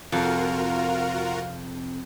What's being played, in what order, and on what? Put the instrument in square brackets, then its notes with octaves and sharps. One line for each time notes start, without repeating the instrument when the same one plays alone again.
[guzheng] F2 [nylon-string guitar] C3 [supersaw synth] F4 F#4 A#4 [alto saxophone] F5